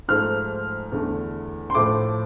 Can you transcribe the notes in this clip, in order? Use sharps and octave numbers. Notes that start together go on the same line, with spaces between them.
G#2 F3 A3 F6
E2 D3 A3
C6
A2 F3 A3 D6